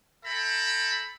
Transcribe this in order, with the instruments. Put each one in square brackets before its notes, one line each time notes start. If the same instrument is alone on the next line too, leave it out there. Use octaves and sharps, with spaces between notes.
[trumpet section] A4 E5 G5 A#5 B5